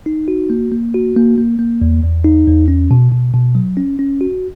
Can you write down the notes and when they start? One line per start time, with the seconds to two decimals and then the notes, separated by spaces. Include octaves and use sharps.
0.06 D#4
0.28 F#4
0.50 A#3
0.72 A#3
0.94 F#4
1.16 A#3
1.38 A#3
1.59 A#3
1.82 E2
2.03 E2
2.24 D#4
2.47 E2
2.68 C#4
2.91 B2
3.12 B2
3.34 B2
3.55 F#3
3.77 C#4
3.99 C#4
4.21 F#4